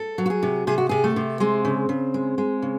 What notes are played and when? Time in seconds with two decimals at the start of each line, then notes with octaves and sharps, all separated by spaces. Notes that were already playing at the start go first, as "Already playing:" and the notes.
Already playing: A4
0.18 F#3
0.26 F#4
0.30 G#4
0.43 C3
0.67 C3 G#4
0.78 F#4
0.89 C3 G#4
1.04 A3
1.16 C3
1.40 G#3 C4
1.65 C#3
1.89 C#3
2.14 G#3
2.38 G#3
2.62 C#3